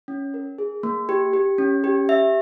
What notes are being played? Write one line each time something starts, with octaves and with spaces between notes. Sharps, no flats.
C#4
A#4
G#4
A#3
G4
G4
C#4
G4
E5